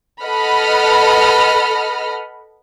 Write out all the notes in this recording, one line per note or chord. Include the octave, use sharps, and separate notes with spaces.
A4 B4 D#5 F#5 B5 F6